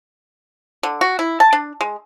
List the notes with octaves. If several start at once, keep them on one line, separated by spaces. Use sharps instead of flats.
D3
F#4
E4
A5
D4
G#3